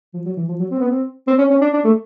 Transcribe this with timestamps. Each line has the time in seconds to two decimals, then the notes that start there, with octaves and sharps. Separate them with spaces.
0.14 F3
0.26 F#3
0.37 E3
0.49 F3
0.59 F#3
0.71 C4
0.80 B3
0.89 C4
1.27 C4
1.38 C#4
1.50 C#4
1.61 D4
1.73 D4
1.84 A3